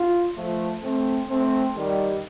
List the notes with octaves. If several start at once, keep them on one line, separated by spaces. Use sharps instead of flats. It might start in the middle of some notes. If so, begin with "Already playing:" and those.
Already playing: F4
F3 A3
A3 C4
A3 C4
D#3 G3